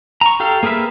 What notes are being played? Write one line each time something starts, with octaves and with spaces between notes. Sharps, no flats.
A#5 C#6
G4 A4 F5
A#3 G#4 A#4 B4 E5